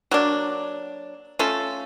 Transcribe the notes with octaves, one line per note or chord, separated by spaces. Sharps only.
F#3 A#3 D4
A3 C#4 F4 A4